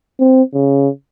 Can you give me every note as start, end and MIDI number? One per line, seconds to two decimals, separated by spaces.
0.20 0.42 60
0.54 0.89 49